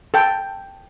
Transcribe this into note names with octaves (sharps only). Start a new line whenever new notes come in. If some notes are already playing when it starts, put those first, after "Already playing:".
A4 G5